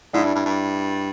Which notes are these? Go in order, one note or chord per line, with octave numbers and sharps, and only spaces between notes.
G#2 D4 E4
G2
G2
G2